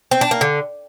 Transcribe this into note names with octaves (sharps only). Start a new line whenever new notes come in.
C4
D4
A#3
D3